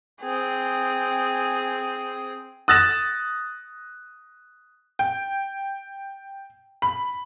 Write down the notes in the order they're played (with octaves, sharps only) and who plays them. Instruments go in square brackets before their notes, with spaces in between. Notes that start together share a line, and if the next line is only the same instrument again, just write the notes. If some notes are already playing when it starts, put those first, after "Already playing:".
[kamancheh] C4 G#4
[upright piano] D#6 F#6 A6 A#6 E7
[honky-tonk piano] G5
B5